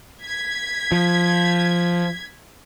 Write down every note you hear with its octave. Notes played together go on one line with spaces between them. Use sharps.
G#6 B6
F3